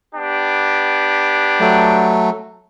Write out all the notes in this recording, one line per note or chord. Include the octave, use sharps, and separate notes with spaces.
B3 D4 G4
F#3 A3